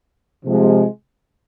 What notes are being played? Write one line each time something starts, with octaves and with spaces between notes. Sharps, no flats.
C3 F3 G#3